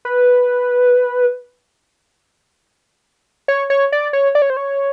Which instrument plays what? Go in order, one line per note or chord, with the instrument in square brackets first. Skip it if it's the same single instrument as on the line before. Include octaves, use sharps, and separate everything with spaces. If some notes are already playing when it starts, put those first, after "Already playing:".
[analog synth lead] B4
C#5
C#5
D5
C#5
D5
C#5
C5
C#5